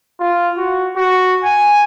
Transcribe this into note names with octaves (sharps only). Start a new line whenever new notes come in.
F4
F#4
F#4
G#5